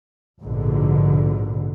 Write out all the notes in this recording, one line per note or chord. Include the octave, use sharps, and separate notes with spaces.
A#1 G#2 B2 D3